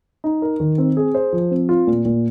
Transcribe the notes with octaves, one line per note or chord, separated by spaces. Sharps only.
D#4
A#4
D#3
C4
G#4
C5
F3
C4
F4
A#2
A#2